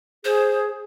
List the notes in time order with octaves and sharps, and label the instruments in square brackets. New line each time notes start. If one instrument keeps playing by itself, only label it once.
[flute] G#4 [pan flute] C5